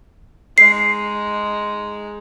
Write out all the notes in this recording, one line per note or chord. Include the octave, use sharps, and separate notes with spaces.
G#3 D#4 C7